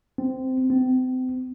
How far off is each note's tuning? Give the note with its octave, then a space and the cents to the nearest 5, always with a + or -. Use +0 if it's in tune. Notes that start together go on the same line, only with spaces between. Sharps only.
C4 -15
C4 -35